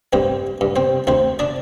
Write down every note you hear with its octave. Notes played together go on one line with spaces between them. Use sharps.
G2 C4 C5
G2
C4 C5
D2 C4 C5
D4 D5